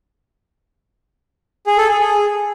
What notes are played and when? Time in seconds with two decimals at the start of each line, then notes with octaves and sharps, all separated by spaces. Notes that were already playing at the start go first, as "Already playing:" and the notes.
1.66 G#4
1.77 A4
1.88 G#4
1.99 G#4